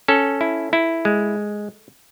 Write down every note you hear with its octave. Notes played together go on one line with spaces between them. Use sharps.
C#4 A4
E4
E4
G#3